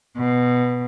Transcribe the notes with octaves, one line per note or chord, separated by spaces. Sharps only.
B2